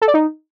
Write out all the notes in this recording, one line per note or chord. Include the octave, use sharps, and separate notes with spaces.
A4
D5
D#4